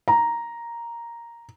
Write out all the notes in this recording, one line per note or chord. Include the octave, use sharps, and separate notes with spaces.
A#5